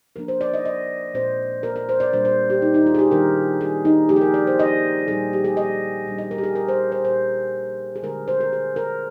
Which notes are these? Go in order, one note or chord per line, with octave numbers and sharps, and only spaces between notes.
C3 F3 A#3 D4 A#4
C5
D5
D#5
D#5
A#2 G#3 C4 C5
A#4
A#4
C5
D5
A#2 G3 D4 C5
C5
G4
D#4
D#4
F4
G#4
G4
D#3 G3 A#3 D4 A#4
G#4
D#4
F3 A#3 D#4 G4
G#4
A#4
D5
C5
D#5
A#2 G3 C4 D#4 G#4
G4
G#4
D#5
A#2 G3 D4
D#5
A#4
G4
G#4
A#4
C5
C5
A#2 G3 D4 C5
G#4
D3 G#3 D4 A#4
C5
A#4
G#4
A#4